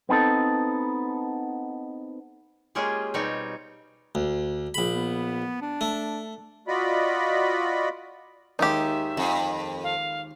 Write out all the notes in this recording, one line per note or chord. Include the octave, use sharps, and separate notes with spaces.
B3 C4 D#4 A4
G#3 A#3 C#4 F4 G4 G#4
B2 G3 C4 D#4 C#5
D2
A#1 C#3 B5
B3
D4
A3
F4 F#4 D5 D#5 B5
D#2 D#3 G#3 D#4 G4 E5
F2
F5